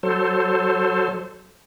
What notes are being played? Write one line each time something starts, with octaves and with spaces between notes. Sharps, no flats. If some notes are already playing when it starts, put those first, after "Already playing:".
F#3 A4 C5